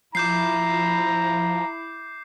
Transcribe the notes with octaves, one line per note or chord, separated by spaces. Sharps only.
F3 E4 A#5 D6 G6 C7